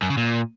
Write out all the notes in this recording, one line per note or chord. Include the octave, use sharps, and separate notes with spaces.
F#2
C#3
A#2